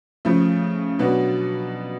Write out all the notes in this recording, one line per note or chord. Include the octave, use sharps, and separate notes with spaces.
C#3 F3 A3
B2 F#3 B3 D4